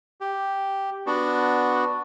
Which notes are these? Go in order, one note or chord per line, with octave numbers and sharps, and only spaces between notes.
G4
B3 D4 F#4